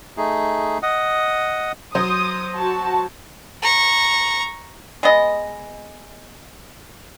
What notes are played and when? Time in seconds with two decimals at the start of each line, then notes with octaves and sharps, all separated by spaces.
0.17 A3 D#4 G#4
0.83 D#5 F#5 D#6
1.95 F#3 C5 C6 D#6
2.57 F#4 A5
3.62 A#5 C#6
5.03 G#3 B3 B4 D#5